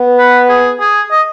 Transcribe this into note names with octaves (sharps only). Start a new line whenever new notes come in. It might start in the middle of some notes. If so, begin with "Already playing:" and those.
Already playing: B3
B4
G#4
G#4
D#5